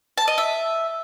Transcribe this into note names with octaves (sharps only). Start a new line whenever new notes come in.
A5
D#5
E5